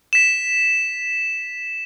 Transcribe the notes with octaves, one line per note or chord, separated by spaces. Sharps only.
B6 E7